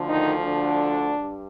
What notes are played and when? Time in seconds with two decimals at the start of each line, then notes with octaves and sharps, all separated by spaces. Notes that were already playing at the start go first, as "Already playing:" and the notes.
Already playing: D2 D3 F3
0.08 D#3 D#4
0.45 D3 D4
1.18 G2